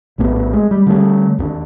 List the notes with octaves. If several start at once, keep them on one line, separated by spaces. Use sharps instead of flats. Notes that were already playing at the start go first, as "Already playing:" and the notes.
A#1 A2 A3 B3
G#3
G3
D3 G3 A3
D#2 A3 D4